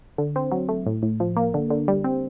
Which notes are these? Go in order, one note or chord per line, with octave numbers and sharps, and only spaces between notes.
D3
C4
F#3
A3
A2
A2
F3
A#3
D3
D3
G3
C4